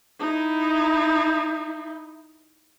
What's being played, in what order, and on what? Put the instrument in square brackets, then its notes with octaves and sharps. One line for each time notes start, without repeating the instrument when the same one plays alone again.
[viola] D#4 E4